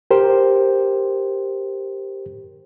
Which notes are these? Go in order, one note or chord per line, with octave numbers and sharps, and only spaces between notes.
G4 A#4 C5